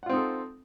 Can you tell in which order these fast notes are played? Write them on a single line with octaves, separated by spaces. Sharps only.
F#5 F4 C4 D#4 A4